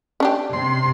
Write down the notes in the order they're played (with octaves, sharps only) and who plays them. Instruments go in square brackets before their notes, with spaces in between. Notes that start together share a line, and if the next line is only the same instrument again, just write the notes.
[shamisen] C#4 D4 G4
[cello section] C3 [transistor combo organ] C6